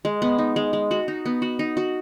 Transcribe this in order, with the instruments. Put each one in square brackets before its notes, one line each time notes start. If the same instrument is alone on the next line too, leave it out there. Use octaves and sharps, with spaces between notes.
[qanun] G#3
B3
D#4
G#3
G#3
F#4
D#4
B3
F#4
D#4
F#4